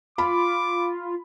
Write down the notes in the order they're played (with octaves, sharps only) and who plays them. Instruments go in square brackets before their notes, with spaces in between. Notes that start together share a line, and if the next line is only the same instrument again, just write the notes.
[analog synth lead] F4 [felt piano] B5 [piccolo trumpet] D6